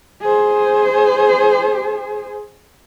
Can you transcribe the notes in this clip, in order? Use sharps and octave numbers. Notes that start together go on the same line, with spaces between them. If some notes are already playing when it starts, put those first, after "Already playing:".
G#4 C5